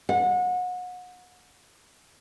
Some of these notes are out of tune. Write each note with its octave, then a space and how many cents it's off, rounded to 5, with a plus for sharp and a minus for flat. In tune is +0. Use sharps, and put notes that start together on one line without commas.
F#5 -30